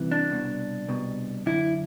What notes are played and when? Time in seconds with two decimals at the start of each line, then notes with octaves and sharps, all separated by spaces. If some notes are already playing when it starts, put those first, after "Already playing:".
Already playing: C2 C3 E3
0.12 D4
0.30 C2 B2
0.89 C2 B2
1.46 F#2 D3 E4